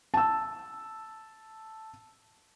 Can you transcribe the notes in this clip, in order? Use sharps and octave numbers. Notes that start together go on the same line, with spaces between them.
A5 E6